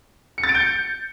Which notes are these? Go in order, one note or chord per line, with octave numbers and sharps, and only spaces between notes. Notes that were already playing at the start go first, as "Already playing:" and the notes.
C#7
A6
D7
G6
C#7